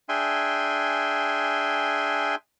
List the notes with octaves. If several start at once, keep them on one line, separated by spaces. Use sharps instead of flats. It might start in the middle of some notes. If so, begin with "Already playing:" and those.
D4 G#4 E5 G5 G#5 C6